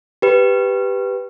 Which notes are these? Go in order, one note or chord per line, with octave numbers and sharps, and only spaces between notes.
G4 B4